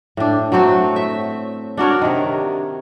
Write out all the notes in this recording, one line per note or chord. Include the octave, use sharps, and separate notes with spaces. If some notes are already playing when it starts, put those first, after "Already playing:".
A2 D4
F#3 A3 C4 F#4
E5
D4 F#4 A#4 C#5
C3 D#3